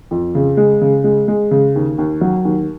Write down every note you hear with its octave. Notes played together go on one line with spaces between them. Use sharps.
F2
C#3
G#3
C#3
G#3
G#3
C#3
D#2
D#2
F#3
D#2